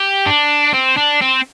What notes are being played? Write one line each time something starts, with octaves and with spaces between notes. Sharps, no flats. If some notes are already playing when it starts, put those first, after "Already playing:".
Already playing: G4
D4
C4
D4
C4